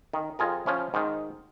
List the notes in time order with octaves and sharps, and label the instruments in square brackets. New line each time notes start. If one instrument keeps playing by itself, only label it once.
[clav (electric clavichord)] D#3
F2 F4 G#4 A#4
F3 C#4 E4
G#2 D#3